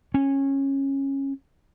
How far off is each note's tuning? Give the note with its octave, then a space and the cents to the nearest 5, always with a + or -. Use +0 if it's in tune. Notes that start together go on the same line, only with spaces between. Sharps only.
C#4 -15